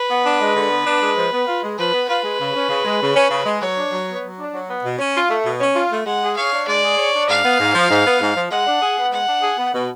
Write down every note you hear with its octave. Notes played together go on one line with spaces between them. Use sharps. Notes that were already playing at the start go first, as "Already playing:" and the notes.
Already playing: B4
B3
D4
G#3
D3
B3
D4
G#3
F3
B3
F4
G#3
F3 B4
B3
F4 B4
G#3
C#3
C#4
C#3
G#3
C#3
C#4
C#3
G#3
F#3 C#5
D4
F#3
B3
F#3
D4
F#3
B3
B2
C#4
F4
A3
B2
C#4
F4
A3
G#3 F#5
G#4
C#5 F5
D4
G#3 D5
G#4
C#5
D4
G#2 F5
B3
G#2
F3
G#2
B3
G#2
F3
G#3 F#5
D4
G#4
B3
G#3 F#5
D4
G#4
B3
B2